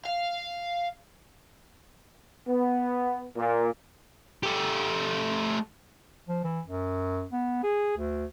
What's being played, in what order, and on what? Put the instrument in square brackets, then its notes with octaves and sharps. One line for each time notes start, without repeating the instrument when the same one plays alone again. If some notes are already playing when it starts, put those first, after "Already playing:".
[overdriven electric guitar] F5
[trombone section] B3
A#2
[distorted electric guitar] A3 G4
[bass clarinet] F3
E3
F#2
B3
G#4
D2